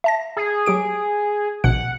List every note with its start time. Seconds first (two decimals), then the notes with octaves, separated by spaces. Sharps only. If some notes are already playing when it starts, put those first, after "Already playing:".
0.04 E5 A5 A#6
0.37 G#4
0.66 F#3 G4 D7
1.64 A#1 B2 F#5 C#7